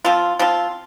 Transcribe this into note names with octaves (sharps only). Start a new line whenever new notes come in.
F3 C4 F4
F3 C4 F4